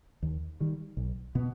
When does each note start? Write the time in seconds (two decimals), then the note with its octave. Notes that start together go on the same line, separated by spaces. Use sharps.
0.23 D#2
0.60 D#3 G3
0.97 B1
1.35 B2 B3